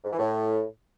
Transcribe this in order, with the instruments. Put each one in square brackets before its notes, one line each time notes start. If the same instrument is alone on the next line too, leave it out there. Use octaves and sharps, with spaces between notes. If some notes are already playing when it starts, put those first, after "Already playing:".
[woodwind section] G#2
E3
A2